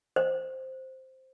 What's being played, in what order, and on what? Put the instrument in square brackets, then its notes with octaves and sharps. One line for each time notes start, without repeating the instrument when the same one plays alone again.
[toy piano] C5